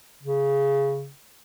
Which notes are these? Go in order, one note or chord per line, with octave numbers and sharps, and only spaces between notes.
C#3